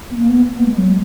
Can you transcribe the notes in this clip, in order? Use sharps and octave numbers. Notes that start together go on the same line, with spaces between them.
B3
A#3
B3
A#3
G#3
F#3